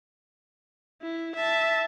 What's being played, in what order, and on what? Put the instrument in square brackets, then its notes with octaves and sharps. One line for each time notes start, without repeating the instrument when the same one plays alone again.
[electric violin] E4
E5 A5